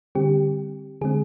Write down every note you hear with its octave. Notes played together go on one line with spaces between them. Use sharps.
D3 G3 C4 G4
D3 G#3 C4 G#4